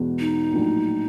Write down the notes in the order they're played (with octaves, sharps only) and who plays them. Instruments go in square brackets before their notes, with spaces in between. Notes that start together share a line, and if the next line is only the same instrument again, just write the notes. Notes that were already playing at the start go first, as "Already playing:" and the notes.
Already playing: [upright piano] E2 B2 G#3 B3
[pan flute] D#4
[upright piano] A#1 A2 F#3 A#3 D4